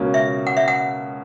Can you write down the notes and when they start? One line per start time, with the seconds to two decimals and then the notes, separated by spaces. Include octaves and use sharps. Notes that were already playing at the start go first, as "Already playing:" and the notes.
Already playing: C#2 B2 A#3 C#4
0.14 E5
0.47 F#5
0.57 E5
0.68 F#5